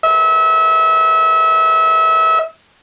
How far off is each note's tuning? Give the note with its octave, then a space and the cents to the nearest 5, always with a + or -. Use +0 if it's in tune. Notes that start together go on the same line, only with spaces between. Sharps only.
E5 -30